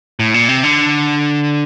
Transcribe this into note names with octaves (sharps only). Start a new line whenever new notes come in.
A2
A#2
C3
D3